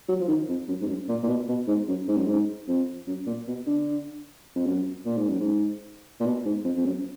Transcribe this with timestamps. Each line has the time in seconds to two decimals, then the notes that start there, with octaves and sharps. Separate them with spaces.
0.08 F#3
0.21 F3
0.28 D#3
0.49 F2
0.68 F#2
0.81 G#2
0.88 F#2
1.08 A#2
1.23 A#2
1.28 B2
1.49 B2
1.67 G#2
1.88 F#2
2.08 G#2
2.17 F#2
2.27 G#2
2.68 F2
3.07 F#2
3.26 A#2
3.47 B2
3.67 D3
4.56 F2
4.66 F#2
5.05 A#2
5.17 G#2
5.29 F#2
5.40 G#2
6.20 A#2
6.25 B2
6.45 G#2
6.65 F2
6.77 F2
6.85 F#2